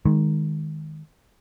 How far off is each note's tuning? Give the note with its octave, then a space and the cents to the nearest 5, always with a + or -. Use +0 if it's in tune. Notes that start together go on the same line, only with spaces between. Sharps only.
D#3 +0 G#3 +0